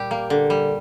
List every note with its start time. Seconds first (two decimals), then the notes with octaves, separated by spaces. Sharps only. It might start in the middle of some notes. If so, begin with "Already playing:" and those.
Already playing: A#2 G3 G4
0.11 A#3
0.30 D3
0.50 G3